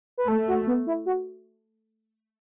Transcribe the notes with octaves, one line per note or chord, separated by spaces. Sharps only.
B4
A3 A4
F#4
B3
E4
F#4